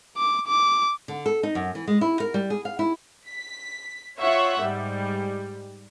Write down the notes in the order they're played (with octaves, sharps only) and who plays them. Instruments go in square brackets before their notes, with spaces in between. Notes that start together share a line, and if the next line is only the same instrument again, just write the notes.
[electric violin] D6
D6
[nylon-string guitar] D3
A4
D#4
F#2
E3
G#3
E4
A#4
G3
G#4
F5
E4
[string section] B6
F4 C#5 E5 F#5
G#2 G3